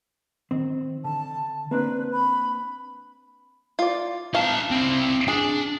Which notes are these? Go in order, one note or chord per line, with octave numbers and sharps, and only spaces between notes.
D#3 C4
D3 A5
A#3 C4 D4 B4
B5
F4 D5
D#4 F5 A5
C4 E4
D4 G#4